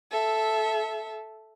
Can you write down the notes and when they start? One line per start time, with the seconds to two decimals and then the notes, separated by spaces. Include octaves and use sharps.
0.11 A4 E5